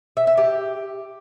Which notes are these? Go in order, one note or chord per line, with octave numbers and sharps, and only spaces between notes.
E5
E5
G4